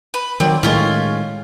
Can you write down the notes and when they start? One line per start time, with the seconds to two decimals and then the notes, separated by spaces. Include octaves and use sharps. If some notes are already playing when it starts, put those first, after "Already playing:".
0.14 B4
0.40 D#3 F#3 C4 D5
0.63 A2 D#3 G#3 C#4 F4 G#5